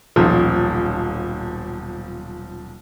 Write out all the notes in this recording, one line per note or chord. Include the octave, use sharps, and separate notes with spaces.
D#1 B1 F3